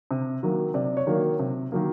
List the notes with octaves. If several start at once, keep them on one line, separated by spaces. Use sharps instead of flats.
C3
D#3 F#3 A#3
C3 D5
C#5
D#3 F#3 A#3
C3
D#3 F#3 A#3